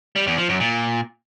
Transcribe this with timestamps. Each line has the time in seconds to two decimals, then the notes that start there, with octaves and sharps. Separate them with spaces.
0.16 G3
0.27 E2
0.38 F3
0.49 F#2
0.60 A#2